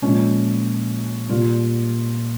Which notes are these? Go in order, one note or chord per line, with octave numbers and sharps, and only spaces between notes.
A#2 F3 G#3 C#4
A#2 G3 F4